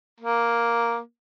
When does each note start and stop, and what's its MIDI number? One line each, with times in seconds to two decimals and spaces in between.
0.20 0.99 58